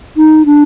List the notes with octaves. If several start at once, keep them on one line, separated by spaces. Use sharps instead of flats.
D#4
D4